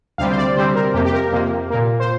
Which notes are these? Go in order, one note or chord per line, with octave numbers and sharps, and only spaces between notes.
D2 C3 G3 C4 F5
C5
D5
D2 C3 G3 C4 C5
A#4
F2 C3 A#3 G4
G4
A#4
F2 C3 A#3
A#2 A#3
C5